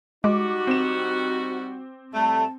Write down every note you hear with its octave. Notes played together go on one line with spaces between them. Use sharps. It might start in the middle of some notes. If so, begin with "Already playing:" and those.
G3 G#3 D#4 F#4 D6
C4 E7
A2 G3 A3 A5